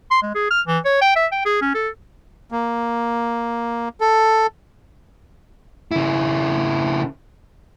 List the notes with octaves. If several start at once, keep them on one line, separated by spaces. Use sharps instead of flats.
C6
G#3
G#4
F6
E3
C#5
G5
E5
G5
G#4
C#4
A4
A#3
A4
C#3 E4